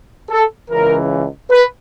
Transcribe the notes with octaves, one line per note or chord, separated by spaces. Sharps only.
A4
C#2 C#3 E3 A#4
B4